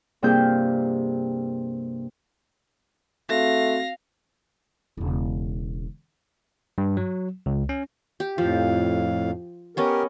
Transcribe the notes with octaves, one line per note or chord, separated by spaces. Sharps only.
G2 C3 A#3 F4 G#4 G6
A3 C4 F#4 F5 A#6
E1 C#3
G2
F#3
C#2
C#4
G4
F2 A2 F3 F5
B3 C#4 G4 A#4 D#5